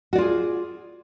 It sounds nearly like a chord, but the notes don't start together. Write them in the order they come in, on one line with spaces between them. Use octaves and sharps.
F#4 D5 F4 G#4